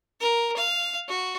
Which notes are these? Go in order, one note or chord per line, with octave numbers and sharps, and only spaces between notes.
A#4
F5
F#4